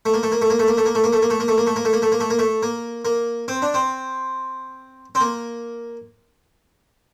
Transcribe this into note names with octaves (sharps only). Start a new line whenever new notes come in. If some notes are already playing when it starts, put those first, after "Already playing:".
A3
A#3
A3
A#3
A3
A#3
A3
A#3
A3
A#3
A3
A#3
A3
A#3
A3
A#3
A3
A#3
A3
A#3
A3
A#3
A3
A#3
A3
A#3
A3
A#3
A#3
C4
D4
C4
C4
A#3